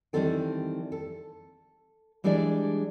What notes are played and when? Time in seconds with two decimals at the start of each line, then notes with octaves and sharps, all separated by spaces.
0.13 D#3 E3 G3 C4 A4 G5
0.92 A4
2.24 E3 G3 G#3 D4 G#4 D5